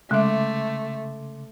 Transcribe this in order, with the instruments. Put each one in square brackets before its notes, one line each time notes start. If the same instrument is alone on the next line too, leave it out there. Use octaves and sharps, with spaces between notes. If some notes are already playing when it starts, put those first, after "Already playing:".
[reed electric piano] C#3 C6 D6 [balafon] G#3 E5 [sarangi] A3